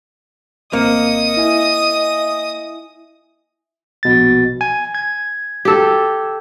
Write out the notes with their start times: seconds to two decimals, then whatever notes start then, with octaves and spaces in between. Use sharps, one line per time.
0.73 G#1 A#3 C4 D#5 D#6 C#7
1.37 E4 E5 G#5
4.03 A#1 B2 A6
4.61 G#5
4.95 G#6
5.65 G4 A4